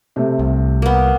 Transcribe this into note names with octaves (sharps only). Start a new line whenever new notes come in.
C3 A3
C2
A#3 B3